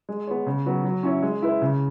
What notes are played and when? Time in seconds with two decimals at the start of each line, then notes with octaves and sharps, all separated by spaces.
0.09 G#3
0.27 B3 G#4 C#5
0.46 C#3
0.66 F#3 B3 F#4
0.84 F#3
1.03 C#4 E4 C#5
1.22 G#3
1.42 E4 B4
1.62 C#3